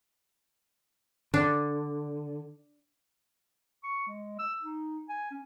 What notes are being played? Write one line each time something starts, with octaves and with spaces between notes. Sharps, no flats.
D3 D4
C#6
G#3
E6
D#4
G#5
C#4